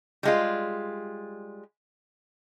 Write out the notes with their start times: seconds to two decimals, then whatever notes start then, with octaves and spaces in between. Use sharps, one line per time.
0.23 G3 G#3 F4